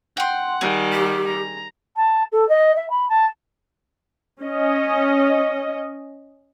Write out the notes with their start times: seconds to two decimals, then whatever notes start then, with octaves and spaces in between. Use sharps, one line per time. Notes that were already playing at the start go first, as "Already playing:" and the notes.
0.17 F#5 G5 C6
0.61 D#3 G3 G#4
0.92 G4
1.26 A#5
1.96 A5
2.32 A4
2.49 D#5
2.76 E5
2.90 B5
3.09 A5
4.42 C#4 D#5